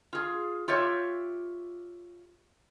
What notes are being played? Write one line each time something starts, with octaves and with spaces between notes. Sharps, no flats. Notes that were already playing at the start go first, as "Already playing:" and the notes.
F4 G#4
F4 G4 C#5 E5